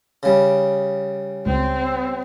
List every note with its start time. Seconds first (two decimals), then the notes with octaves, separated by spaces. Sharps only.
0.23 C#3 G3
1.46 C#2 C4